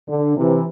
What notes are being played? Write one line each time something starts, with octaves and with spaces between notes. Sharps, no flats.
D3
C3 E3